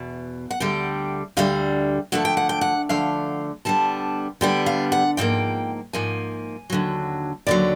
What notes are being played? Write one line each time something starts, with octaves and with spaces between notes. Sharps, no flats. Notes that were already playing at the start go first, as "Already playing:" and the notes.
Already playing: E2 B2
F#5
D2 D3 G3 G5
D2 D3 G3 F5
D3 F3 A3 F#5
G5
F#5
G5
F#5
D3 F3 A3 F5
D3 G3 B3 A5
D3 G3 B3 G5
F5
F#5
G#2 F3 A#3 G5
G#2 F3 A#3 G#5
D#2 D3 F#3
D#2 D3 F#3 D5